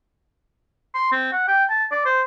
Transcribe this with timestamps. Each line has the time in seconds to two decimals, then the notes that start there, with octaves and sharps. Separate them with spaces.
0.95 C6
1.12 C4
1.33 F#5
1.48 G5
1.70 A5
1.92 D5
2.06 C5